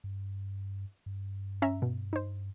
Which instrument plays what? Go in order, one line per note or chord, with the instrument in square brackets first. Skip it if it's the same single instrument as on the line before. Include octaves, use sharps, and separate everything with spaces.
[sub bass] G2
G2
[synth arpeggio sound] C#4 E5 A#5
B2
D#4 C5